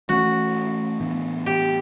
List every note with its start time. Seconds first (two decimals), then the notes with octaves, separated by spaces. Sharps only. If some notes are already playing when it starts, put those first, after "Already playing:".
0.09 E3 A3 C#4 F#4
1.00 A2 E3 B3 D4
1.46 G4